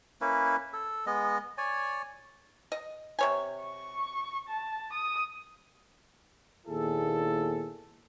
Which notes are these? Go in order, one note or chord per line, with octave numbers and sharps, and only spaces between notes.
A#3 C#4 E4 B4
A4
G#3 B3 D#5
C#5 D5 G#5
D#5
C3 C#5 G#5
C#6
A5
D#6
D#2 A#2 B3 E4 G#4 A4